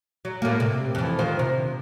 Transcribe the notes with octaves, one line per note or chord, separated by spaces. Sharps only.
F#3
A2 A#3
C3
F2 E3
D#3 F4 C5
C3